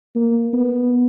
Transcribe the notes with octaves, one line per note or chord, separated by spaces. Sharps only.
A#3
B3